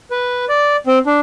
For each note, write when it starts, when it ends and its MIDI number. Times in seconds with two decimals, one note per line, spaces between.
0.11 0.45 71
0.49 0.76 74
0.87 0.99 60
1.06 1.20 62